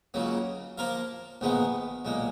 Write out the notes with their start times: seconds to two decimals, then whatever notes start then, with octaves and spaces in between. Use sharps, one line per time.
0.14 C#2 C#3 F#3 A#3
0.78 F3 A#3 F4 A#4 F5
1.41 A#1 G#2 D#3 G#3 B3
2.05 B1 A#2 G#3